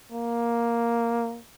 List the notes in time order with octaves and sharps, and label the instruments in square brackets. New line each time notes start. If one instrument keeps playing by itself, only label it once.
[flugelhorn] A#3